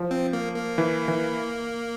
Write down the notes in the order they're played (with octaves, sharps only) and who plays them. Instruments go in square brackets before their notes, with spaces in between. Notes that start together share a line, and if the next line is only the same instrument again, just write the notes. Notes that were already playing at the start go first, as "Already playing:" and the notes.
Already playing: [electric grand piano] F3
[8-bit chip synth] C4
A#3
A#3
[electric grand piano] E3
E3